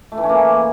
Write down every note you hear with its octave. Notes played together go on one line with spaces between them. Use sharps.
A3
E3
C#4
A#3